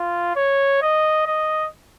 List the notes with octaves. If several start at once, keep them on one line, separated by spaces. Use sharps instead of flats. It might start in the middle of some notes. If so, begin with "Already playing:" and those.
Already playing: F4
C#5
D#5
D#5